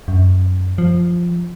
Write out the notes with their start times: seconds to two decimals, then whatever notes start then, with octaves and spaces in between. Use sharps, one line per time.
0.08 F#2
0.78 F3